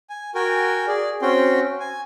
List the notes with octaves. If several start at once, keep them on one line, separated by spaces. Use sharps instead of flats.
G#5
F#4 A#4 G5 G#5
G#4 D5
C4 C#4 F#4 G5 C6
G#5